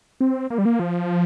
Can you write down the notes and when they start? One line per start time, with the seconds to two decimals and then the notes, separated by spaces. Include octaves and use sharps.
0.21 C4
0.50 A#3
0.58 G3
0.65 A#3
0.79 F3